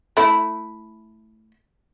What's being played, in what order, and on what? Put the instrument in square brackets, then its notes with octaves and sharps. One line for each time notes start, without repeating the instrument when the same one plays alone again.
[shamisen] A3 E4